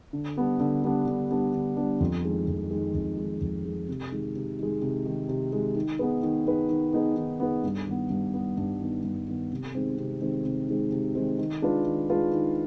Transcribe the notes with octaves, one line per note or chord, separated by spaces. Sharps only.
D3
G3 B3 D4
D3
G3 B3 D4
D3
G3 B3 D4
D3
G3 B3 D4
F2
D#3 G#3
F2
D#3 G#3
F2
D#3 G#3
F2
D#3 G#3
C3
D#3 G#3
C3
D#3 G#3
C3
D#3 G#3
C3
D#3 G#3
D#3
B3 D#4 G#4 B4
D#3
B3 D#4 G#4 B4
D#3
B3 D#4 G#4 B4
D#3
B3 D#4 G#4 B4
G2
D#3 B3
G2
D#3 B3
G2
D#3 B3
G2
D#3 B3
C3
D#3 G#3 C4
C3
D#3 G#3 C4
C3
D#3 G#3 C4
C3
D#3 G#3 C4
D#3
G#3 D4 F4 B4
D#3
G#3 D4 F4 B4
D#3